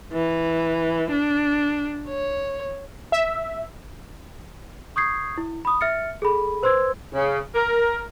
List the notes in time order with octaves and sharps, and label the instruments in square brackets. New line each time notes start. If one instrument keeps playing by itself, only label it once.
[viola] E3
D4
C#5
[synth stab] E5
[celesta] C#6 D#6 G6 G#6 C7
E4
B5 D#6
E5 F6 A6 C#7
G#4 A4 B5
B4 C5 C6 E6 G#6
[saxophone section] C#3
A#4